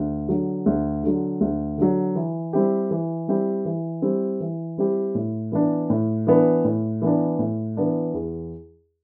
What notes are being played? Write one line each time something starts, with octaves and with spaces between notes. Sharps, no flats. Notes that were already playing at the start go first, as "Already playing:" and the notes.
Already playing: D2
D3 F#3
D2
D3 F#3
D2
D3 F#3
E3
G3 C4 E4 G4
E3
G3 C4 E4 G4
E3
G3 C4 E4 G4
E3
G3 C4 E4 G4
A2
E3 B3 D4
A2
E3 B3 D4
A2
E3 B3 D4
A2
E3 B3 D4
E2